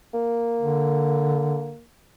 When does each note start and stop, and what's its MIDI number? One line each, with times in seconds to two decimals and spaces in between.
0.14 1.84 58
0.61 1.73 50